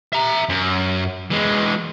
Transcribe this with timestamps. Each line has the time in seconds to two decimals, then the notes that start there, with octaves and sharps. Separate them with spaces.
0.13 E5 A#5
0.49 F#2
1.31 E3 G#3